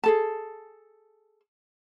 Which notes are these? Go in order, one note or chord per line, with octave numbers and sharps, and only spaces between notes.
G#4 A4 A5